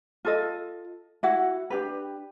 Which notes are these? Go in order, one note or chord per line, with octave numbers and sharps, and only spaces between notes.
F4 A4 D#5
E4 F#4 F#5
D4 G4 B4